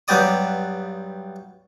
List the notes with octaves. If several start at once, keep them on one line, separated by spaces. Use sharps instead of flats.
G2 F#3 B3 G4 D5 D#6